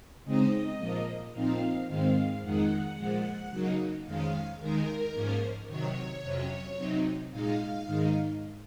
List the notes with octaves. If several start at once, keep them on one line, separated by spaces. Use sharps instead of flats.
C#3 G#3 C4 D#4 D#5
A#2 F3 A#3
A#2 F3 C4 D#4 F5
G#2 D#3 G#3 C4 F5
F2 D#3 G#3 D#4 F#5
A#2 F3 G#3
C#3 F#3 A#3 D#4
F2 D#3 G#3 C#4 F5
D#2 D#3 G#3 D#4 A#4
G#2 F3 A#3 C#4
C3 D#3 F#3 C#5
F2 C3 F#3 C#4
C3 F#3 C4 D#4
A#2 G#3 D#4 F5
G#2 D#3 G#3 D#4